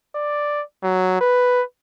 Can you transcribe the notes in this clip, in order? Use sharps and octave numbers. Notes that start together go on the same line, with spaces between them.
D5
F#3
B4